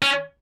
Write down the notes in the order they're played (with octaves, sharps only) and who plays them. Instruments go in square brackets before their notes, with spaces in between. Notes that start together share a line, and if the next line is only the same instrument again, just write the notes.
[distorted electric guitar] C#4